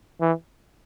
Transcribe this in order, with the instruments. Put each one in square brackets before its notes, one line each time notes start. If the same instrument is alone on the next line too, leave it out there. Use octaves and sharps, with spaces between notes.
[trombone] E3